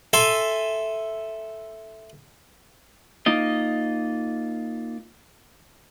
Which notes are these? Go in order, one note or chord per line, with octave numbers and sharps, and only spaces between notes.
A4 E5 G#5 C6
A#3 D#4 F4 D#5